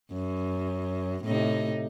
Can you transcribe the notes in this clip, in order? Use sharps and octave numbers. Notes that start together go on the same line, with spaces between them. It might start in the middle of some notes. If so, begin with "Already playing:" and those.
F#2
A2 C3 D#4